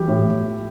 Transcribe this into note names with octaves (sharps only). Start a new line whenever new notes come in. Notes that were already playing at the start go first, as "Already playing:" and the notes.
Already playing: E3 G3 G4
A2